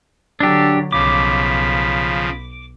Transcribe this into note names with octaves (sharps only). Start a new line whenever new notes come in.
D3 F#3 D4 G4 A4
B1 C#3 F3 B5 D6